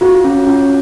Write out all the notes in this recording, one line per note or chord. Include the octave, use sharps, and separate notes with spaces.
F4 F#4
C#4
C#4